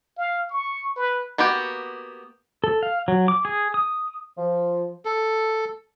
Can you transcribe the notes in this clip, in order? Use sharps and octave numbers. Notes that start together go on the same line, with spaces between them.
F5
C#6
B4
A#3 B3 F#4 G4
A4
F5
F#3
D6
G#4
D#6
F3
A4